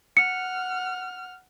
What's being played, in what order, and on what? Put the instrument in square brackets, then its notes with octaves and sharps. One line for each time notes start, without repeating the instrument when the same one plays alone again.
[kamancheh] F#5 F6 [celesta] C#7